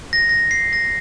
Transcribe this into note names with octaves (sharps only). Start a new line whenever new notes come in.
A#6
A#6
C7
A#6